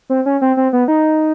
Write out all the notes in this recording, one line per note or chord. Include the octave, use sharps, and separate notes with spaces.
C4
C#4
C4
C4
B3
D#4